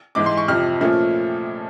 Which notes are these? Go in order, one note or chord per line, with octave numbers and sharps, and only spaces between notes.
G#2 E3 G#3 D6
C6
C#6
F2 C3 F3 F6
A#2 F3 A3 C#4